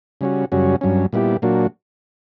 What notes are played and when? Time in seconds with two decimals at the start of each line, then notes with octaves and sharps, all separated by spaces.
0.21 C#3 G3 C#4 F#4
0.52 F#2 C#3 G3 C#4 F#4
0.81 G2 F#3 C#4
1.13 A#2 G3 B3 E4 G4
1.42 A#2 F#3 A#3 D4 F#4